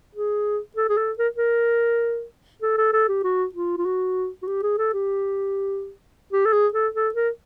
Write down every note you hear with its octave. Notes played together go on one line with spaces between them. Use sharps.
G#4
A4
G#4
A4
A#4
A#4
A4
A4
A4
G4
F#4
F4
F4
F#4
F#4
G4
G#4
A4
G4
G4
A4
G#4
A4
A4
A#4